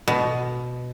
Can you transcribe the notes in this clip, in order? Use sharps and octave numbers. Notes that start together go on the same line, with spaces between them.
B2